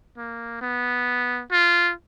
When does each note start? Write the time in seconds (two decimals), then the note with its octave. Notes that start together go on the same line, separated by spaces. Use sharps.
0.17 A#3
0.61 B3
1.52 F4